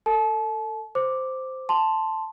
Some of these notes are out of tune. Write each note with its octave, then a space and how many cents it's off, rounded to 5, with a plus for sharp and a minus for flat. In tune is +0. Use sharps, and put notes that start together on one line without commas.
A4 +30 A5 -35
C5 -10 D6 +0
A5 +0 C6 +0